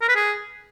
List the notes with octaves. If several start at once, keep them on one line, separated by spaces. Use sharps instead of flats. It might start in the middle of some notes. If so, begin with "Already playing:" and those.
A#4
B4
G#4